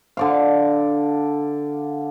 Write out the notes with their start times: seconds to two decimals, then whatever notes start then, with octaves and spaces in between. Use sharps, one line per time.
0.17 D3 D5 F5